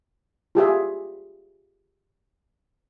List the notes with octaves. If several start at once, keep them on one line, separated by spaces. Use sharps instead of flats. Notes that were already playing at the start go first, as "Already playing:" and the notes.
F4 G4 G#4 E5